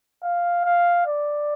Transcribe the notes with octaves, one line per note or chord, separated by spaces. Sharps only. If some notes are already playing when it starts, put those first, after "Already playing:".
F5
F5
D5